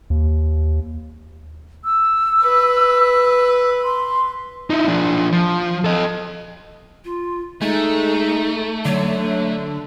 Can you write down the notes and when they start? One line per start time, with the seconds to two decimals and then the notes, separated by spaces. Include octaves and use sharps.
0.10 D#2
1.85 E6
2.42 B4
3.84 C6
4.70 D#4 E4
4.88 F3 D4
5.33 F3
5.85 A4 D#5
7.05 F4
7.61 G#3 A3 D#4
8.85 D3 F#3